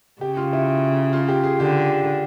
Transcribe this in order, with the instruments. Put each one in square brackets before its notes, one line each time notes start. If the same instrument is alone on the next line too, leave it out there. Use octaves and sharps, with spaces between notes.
[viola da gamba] C#3 [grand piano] G4
[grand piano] F4
E4
F4
G4
G#4
[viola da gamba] D3 [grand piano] G4